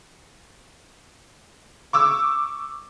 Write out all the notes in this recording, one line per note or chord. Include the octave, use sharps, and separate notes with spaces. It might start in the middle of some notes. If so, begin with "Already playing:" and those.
C#6 D6 E6